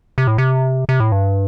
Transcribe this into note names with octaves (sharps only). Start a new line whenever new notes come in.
C3
A2
C3
C3
A2
G2